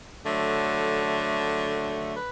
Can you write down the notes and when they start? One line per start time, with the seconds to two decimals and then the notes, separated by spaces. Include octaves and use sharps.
0.24 D3 F#3 A3
2.16 B4